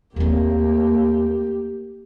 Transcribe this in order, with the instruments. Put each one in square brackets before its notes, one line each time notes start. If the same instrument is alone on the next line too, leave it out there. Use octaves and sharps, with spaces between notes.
[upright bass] D#2 C4 [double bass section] A3 A#3 [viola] G4